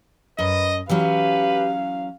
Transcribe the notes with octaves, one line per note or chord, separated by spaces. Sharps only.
F#2 B4 D#5
E3 F#3 C#4 G4 B4 F5